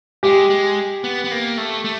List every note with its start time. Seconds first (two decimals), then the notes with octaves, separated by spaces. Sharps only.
0.23 G#3 G4
0.50 G#3
1.04 B3
1.24 B3
1.31 A#3
1.58 A3
1.85 A3